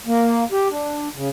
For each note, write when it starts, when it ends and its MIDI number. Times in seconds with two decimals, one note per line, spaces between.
0.07 0.44 58
0.52 0.68 67
0.71 1.08 62
1.16 1.29 49